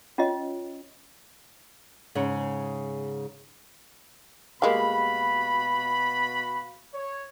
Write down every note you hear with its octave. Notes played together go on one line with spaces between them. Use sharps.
C#4 F4 C#5 D#5
G#2 C#3
B2 G3 G#3 A#3 F#4 F5 B5
C#5